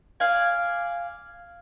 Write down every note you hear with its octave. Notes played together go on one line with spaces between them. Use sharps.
D5 F5 G#5